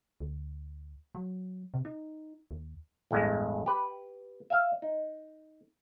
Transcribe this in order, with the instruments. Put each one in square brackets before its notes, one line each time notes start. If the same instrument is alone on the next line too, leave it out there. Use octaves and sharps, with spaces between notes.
[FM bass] D2
F#3
C3
D#4
D#2
[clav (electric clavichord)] A1 E2 G2 G#3
G4 B4
E5 F5
D#4